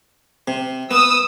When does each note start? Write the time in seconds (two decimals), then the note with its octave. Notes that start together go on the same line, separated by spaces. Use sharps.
0.48 C3
0.91 B3 D#6 E6